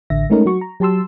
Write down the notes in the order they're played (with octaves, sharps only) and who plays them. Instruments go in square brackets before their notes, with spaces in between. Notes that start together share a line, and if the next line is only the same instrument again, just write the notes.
[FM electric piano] A1 D3 E5 A#6
G#3 A3 C#4 D#4 A#4
F#3 F#4 C#6
A#5
F#3 G4 A5 C6 E6